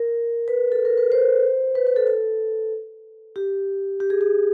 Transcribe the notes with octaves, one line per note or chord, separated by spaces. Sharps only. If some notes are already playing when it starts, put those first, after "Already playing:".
Already playing: A#4
B4
A4
A#4
B4
C5
B4
B4
A4
A4
G4
G4
G#4
G#4